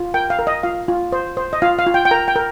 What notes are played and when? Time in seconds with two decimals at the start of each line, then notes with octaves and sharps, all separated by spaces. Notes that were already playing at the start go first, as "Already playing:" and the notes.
Already playing: F4
0.14 A#4 G5
0.30 F5
0.39 A#4
0.47 D#5
0.63 F4 F5
0.88 F4
1.12 C5
1.37 C5
1.53 D#5
1.62 F4 F5
1.79 F5
1.87 F4
1.94 G5
2.05 G5
2.11 A#4 A#5
2.28 G5
2.36 A#4